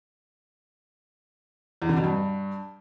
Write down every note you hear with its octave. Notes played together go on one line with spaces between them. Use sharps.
E2
D3
B2
G2